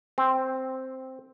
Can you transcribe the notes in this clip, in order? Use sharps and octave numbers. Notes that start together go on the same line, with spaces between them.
C4